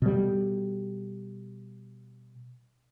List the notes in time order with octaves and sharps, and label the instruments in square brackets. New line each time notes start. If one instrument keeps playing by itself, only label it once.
[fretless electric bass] B2 G3